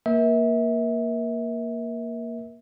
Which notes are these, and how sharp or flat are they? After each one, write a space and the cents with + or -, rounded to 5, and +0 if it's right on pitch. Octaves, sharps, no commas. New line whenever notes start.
A#3 +0 A#4 +35 E5 -25